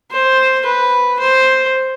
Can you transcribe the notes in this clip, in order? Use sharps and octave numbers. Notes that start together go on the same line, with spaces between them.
C5
B4
C5